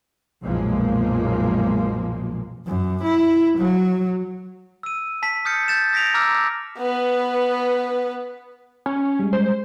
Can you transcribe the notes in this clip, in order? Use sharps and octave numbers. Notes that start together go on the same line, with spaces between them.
B1 F#2 A#2 F3 G#3 A#3
F#2
E4
F#3
E6 D#7
A5 B6
D#6 F6 G6 A6 C#7
G6 A6 E7
D#6 A#6 B6 D7 F7
A#5 D6 E6 F6 A#6
B3 B4
C#4
G3 G#3
C5